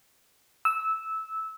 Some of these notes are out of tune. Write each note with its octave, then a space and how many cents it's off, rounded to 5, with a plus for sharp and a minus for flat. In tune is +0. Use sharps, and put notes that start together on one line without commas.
E6 -15